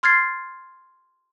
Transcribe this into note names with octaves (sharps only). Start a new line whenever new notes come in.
C6 F6 G#6 A6 C7